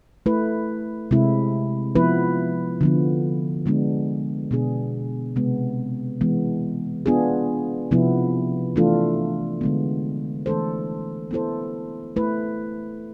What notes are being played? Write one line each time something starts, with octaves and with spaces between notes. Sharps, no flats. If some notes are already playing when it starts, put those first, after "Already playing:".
A3 E4 B4
C3 G#3 C4 E4
F3 B3 E4 B4
D3 F3 B3
D3 G#3 B3 D4
B2 B3 D4 G#4
C3 G#3 B3
E3 G#3 B3
B3 D4 F4 G#4
C3 F3 B3 E4
E3 A3 D4 F4 A4
D3 G#3 B3
E3 A3 D4 A4 C5
B3 E4 A4 C5
A3 E4 B4